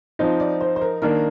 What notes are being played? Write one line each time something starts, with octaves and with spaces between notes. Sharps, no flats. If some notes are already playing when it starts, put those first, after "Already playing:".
F3 C4 D#4 C5
D5
C5
C5
A#4
D#3 A#3 D4 A#4